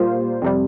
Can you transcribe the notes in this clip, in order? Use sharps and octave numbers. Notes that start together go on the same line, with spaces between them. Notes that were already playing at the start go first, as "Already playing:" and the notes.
Already playing: A#2 G3 A#3 F4 C5
F2 C3 G3